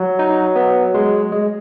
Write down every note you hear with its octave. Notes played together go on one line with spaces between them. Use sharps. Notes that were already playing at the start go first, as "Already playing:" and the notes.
Already playing: F#3
D#4
B3
G#3
G#3